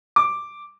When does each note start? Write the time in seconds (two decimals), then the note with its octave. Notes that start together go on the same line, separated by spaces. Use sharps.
0.16 D6